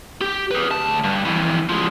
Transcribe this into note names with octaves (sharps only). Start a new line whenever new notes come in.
G4
G#4 B4
D2 A5
G2
F2 E3
F3 G#3